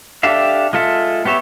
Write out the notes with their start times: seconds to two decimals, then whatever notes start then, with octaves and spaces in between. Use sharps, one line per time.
0.23 D4 G4 A4 E5 F5
0.73 G#3 F4 A4 E5
1.25 B3 G4 C#5 E5